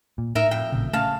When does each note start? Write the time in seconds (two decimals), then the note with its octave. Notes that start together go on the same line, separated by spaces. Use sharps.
0.18 A#2
0.35 A2 D#4 A#4 E5
0.51 F2 G5
0.72 A1 A#2 C#3
0.93 C#3 A3 F5 A5